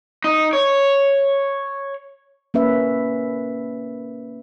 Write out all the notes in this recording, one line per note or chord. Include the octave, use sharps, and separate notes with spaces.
D#4
C#5
A#3 C#4 B4 E5